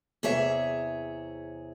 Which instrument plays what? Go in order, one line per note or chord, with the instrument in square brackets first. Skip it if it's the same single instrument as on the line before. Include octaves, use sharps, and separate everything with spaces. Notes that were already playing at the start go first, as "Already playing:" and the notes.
[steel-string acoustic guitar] E2 C3 G#4 C#5 E5